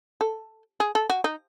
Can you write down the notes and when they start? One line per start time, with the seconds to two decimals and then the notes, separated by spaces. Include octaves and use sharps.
0.21 A4
0.80 G#4
0.95 A4
1.10 F#4
1.24 D#4